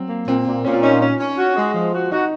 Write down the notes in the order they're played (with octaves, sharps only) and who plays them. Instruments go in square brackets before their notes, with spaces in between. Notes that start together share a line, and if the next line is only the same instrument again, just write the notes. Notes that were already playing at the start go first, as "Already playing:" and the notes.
Already playing: [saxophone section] F#3 [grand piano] C4
[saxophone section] A#3
[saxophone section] A#2 [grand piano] C4
[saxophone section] A#2
[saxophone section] A#2 [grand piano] C#4
[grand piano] F4
[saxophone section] C#4 [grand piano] D#4
[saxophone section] C#4
C#4
F#4
G#3
F3
F#4
[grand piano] D#4 [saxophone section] F#4